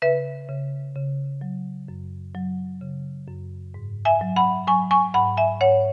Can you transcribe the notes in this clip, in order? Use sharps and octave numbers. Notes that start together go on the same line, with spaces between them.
C#3 B4 E5
C#3
C#3
F#3
F#2
F#3
C#3
F#2
G#2
E5 G#5
F#3
F#5 B5
F#3 G#5 C#6
G#5 C#6
G#2 F#5 B5
E5 G#5
G#2 C#5 F#5